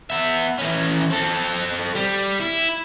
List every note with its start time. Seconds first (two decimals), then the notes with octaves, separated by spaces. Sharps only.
0.10 B3 E5
0.58 E3 C#4
1.10 C4 A4
1.96 G3
2.40 E4